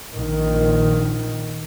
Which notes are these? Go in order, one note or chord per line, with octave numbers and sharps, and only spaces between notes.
A#1 D#3